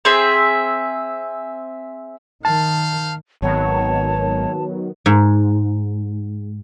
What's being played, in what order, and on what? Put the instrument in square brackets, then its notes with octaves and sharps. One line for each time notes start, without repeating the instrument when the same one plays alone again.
[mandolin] C4 G#4 E5
[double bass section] D#3 [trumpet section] C5 F5 [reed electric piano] A5
[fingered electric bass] G#1 [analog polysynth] D#3 F#3 B3 [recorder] C#5 [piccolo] A5
[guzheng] G#2